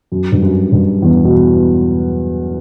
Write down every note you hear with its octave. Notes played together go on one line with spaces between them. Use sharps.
F#2
G2
F#2
G2
E2
B2